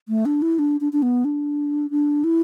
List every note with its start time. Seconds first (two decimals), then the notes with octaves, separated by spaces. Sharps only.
0.09 A3
0.26 D4
0.42 E4
0.59 D4
0.81 D4
0.93 D4
1.02 B3
1.25 D4
1.90 D4
2.24 E4